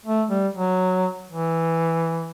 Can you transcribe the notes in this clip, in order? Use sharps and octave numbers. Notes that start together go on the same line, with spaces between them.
A3
G3
F#3
E3